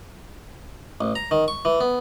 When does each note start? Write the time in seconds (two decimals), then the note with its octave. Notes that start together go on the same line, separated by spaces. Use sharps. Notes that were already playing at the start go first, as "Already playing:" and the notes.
1.01 A1
1.15 A#5
1.31 D#3
1.48 C#6
1.65 E3
1.81 B3